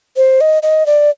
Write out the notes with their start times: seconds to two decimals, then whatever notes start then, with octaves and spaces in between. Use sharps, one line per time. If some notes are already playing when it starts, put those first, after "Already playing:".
0.17 C5
0.41 D#5
0.63 D#5
0.86 D5